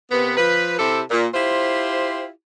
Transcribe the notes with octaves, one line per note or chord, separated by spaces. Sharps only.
C3 A#3 B3
F3 B4
C3 C4 E4 G4 A4
A#2
E4 F4 G4 C5